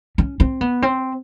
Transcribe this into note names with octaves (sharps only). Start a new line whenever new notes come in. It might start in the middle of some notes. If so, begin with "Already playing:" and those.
C#4
C4
B3
C4